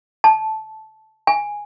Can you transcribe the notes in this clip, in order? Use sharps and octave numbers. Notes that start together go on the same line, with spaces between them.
A5
G#5